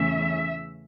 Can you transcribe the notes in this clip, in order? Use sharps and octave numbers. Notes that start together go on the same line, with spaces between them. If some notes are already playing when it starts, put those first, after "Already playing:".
Already playing: E2 C#3 E3 A3 C#4 E5